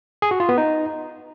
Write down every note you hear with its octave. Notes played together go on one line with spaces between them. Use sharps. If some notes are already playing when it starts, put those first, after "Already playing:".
G#4
F#4
F4
B3
D#4